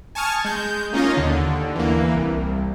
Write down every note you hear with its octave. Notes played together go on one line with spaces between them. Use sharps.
G#5 A5 C#6 D#6 F6 G#6
G#3 G6
A#3 C#4 D#4 F4 D#5
D#2 D3
E3 A#3
C2